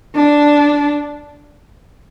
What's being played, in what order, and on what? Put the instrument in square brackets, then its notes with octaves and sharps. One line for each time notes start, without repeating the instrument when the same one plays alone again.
[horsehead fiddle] D4